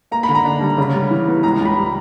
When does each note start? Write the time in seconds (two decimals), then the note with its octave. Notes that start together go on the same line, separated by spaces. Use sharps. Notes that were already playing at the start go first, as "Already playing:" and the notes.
0.11 A#3 A#5
0.23 B5
0.29 D3
0.35 A#5
0.45 D4
0.61 G3
0.78 C#3
0.94 G3
1.11 E3
1.27 B3
1.43 C#2 A#5
1.61 C#2 B5
1.77 G3